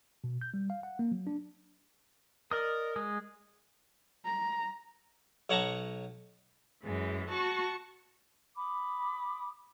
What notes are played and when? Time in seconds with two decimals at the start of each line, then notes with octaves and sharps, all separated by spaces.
0.24 B2
0.41 G6
0.54 G3
0.70 F5
0.83 F#5
0.99 A#3
1.12 F#3
1.27 D4
2.51 A#4 D5 D#5 D#6
2.96 G#3 D#6
4.25 A#5
5.50 B1 C#5 F#5 A5 A#5 C#6
6.84 F#2 E3 G#3
7.29 F#4 A5 C#6
8.56 B5 D6 D#6